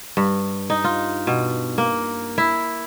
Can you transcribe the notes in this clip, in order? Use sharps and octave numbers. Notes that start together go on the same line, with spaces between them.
G2
D#4
F4
B2
A#3
E4